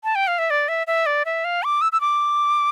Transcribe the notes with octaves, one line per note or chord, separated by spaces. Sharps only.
A5
G5
F5
E5
D5
E5
E5
D5
E5
F5
D6
E6
E6
D6